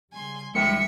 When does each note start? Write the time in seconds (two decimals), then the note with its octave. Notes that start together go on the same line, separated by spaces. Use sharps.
0.13 C#3 G3 G#5 C6
0.55 D2 E3 G3 G#3 A4 E5 G5 C#7